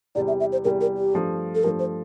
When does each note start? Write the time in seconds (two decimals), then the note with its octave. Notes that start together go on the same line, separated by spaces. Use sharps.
0.15 E2 C3 G3 D5
0.28 E5
0.40 E5
0.52 C5
0.64 E2 C3 G3 A#4
0.81 A#4
0.97 G4
1.14 G2 F3 A3
1.55 A4
1.63 G2 F3 A3 A#4
1.79 C5